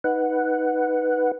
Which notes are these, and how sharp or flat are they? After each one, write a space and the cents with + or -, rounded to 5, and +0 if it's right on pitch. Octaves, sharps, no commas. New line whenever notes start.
D#4 +10 B4 +0 F#5 +0